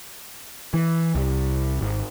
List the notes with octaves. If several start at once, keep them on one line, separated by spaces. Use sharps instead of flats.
E3
C2
G#1